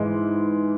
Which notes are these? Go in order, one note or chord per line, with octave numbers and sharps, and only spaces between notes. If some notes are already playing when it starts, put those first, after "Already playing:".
Already playing: G#2 E3 G#3